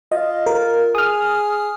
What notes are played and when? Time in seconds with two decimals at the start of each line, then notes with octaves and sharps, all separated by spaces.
0.12 F4 D#5
0.46 A#4
0.95 G#4 D#6 F6